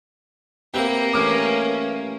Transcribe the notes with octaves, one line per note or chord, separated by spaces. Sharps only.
A#3 C4 G4 B4 E5 F#5
G2 E3 A3 C#4 D6 F6